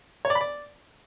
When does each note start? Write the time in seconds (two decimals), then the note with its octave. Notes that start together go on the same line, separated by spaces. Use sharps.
0.25 C#5
0.30 D5
0.35 B5
0.41 D5